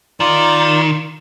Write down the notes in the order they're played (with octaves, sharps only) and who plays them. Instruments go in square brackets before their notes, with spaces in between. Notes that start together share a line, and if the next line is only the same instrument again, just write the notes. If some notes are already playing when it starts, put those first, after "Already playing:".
[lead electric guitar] D#3 [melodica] F4 D5